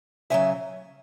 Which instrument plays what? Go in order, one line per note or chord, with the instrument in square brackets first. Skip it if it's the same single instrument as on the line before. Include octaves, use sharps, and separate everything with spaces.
[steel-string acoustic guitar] E2 C#3 F#3 E5 G#5